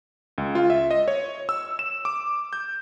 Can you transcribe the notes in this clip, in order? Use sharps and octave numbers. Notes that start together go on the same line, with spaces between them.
C#2
F4
E5
D#5
C#5
E6
E7
D6
G6